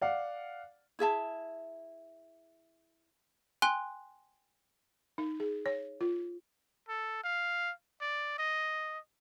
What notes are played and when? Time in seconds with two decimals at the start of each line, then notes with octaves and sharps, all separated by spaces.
0.01 D5 F5 F#5
0.99 E4 G#4 E5 A5
3.62 G5 G#5 C6 F#6 G7
5.18 D#4
5.40 G#4
5.66 C#5
6.01 F4
6.89 A4
7.24 F5
8.01 D5
8.39 D#5